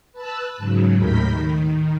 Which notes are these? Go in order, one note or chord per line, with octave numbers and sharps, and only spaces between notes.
B4 A5 E6 F#6
G#2 C#3 F#3
D#2 A2 A#4 B5 G6 B6
D#3